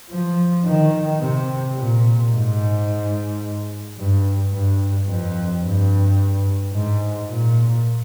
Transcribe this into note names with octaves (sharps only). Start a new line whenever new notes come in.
F3
D#3
C3
A#2
G#2
G2
G2
F2
G2
G#2
A#2